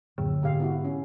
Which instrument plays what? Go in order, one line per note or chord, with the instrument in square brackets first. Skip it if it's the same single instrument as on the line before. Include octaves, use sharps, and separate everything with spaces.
[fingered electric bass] D1 F#2 A#2 [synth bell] D3
[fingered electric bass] G#2 B2 [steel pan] G#3 G4 F5
[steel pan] B3 E4 F#4
C#4